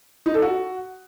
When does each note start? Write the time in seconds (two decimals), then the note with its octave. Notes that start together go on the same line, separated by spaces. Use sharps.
0.26 D#4
0.34 A4
0.42 F#4